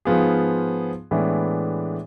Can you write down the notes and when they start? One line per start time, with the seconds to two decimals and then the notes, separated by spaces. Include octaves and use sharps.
0.05 G#2 F3 B3 F4 G#4
1.11 A2 E3 G#3 B3 D4